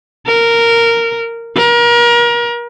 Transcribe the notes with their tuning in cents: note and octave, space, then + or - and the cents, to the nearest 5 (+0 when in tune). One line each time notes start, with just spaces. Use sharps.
A#4 -10
A#4 +35